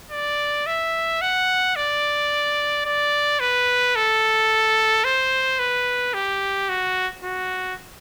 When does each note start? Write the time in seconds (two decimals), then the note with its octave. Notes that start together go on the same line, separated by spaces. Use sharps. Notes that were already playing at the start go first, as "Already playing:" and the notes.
0.11 D5
0.67 E5
1.22 F#5
1.76 D5
2.85 D5
3.40 B4
3.96 A4
5.05 C5
5.60 B4
6.14 G4
6.70 F#4
7.24 F#4